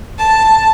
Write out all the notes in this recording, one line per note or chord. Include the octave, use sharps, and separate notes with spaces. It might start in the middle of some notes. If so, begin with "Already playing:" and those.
A5